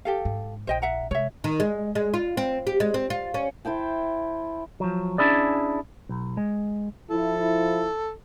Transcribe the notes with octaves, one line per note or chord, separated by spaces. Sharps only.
G4 A4 F5
G#2
A#1 C5 D#5 G5
E5 F#5 A#5
C3 G#3 C#5 E5
D#3
G#3
G#3
F4
C4
G4
G#3
C4
F4
C#4
E4 C5 G5 A5
F3 F#3
C#4 D4 E4 G#4 D5
B1
G#3
F3 E4 A4